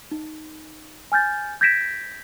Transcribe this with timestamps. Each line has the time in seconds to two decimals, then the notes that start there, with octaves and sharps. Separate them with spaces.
0.11 D#4
1.12 G#5 F6 G6 A6
1.61 G6 G#6 A#6 B6 D7 E7